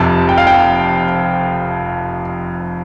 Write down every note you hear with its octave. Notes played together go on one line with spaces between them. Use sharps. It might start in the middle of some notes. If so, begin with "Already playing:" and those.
Already playing: F1 F2 C3 A5
G5
F5
G5